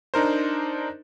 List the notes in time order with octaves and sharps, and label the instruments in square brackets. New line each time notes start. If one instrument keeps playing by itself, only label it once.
[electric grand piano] D4 D#4 A#4 C5